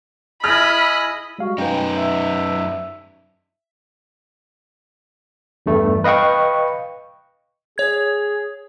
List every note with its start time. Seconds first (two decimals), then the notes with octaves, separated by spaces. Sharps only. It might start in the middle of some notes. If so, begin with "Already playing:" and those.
0.44 E4 G#4 D#5 B5 F6
1.39 G3 G#3 F#4 F5
1.58 F#2 C#4 D#4 B4 G5
1.96 E5
5.66 E2 G2 A3
6.04 B4 D#5 F5 G5 C#6
7.78 G#4 C#5 G#6